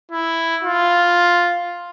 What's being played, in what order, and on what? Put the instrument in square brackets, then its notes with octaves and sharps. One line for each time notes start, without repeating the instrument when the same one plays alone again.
[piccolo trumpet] E4
F4